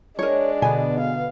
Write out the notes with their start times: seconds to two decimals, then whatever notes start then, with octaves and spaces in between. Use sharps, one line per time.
0.19 G#3 D4 A#4 C#5
0.62 B2 D3 B3 G#5
1.00 F5